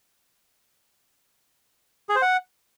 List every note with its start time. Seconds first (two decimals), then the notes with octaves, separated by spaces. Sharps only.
2.09 G#4
2.16 C5
2.22 F#5